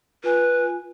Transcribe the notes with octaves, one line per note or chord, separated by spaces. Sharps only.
F4 B4 G#5